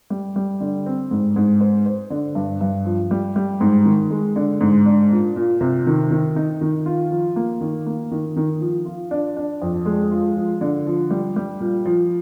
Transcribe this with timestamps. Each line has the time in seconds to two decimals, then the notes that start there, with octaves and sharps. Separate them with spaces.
0.10 G3
0.36 G3
0.60 D3
0.86 C4
1.11 G#2
1.36 G#2
1.61 C5
1.86 C5
2.10 D3
2.35 G2
2.61 G2
2.85 F3
3.11 G3
3.36 G3
3.61 G#2
3.86 D#3
4.11 G#3
4.36 D3
4.61 G#2
4.86 D4
5.11 A#2
5.36 A#2
5.61 C3
5.87 D#3
6.11 D#3
6.36 D#4
6.61 D#3
6.86 F4
7.11 F3
7.36 A#3
7.61 D#3
7.86 A#3
8.11 D#3
8.36 D#3
8.61 F3
8.85 F4
9.11 D4
9.37 D4
9.62 F2
9.85 G#3
10.12 F4
10.36 F3
10.61 D3
10.87 F3
11.10 G3
11.36 G3
11.60 A#2
11.85 F3